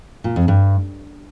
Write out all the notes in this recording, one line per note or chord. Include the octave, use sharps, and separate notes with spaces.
A#2
F2
G2